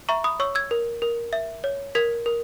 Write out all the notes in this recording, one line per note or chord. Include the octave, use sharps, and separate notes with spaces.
E5 A#5 C#6
B5 D#6
C#5 C#6 E6
E6 G#6
A#4
A#4
E5
C#5
A#4 G#6 B6
A#4